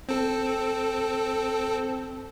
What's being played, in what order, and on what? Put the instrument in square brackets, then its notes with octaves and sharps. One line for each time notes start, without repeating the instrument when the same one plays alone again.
[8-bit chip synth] C4 A4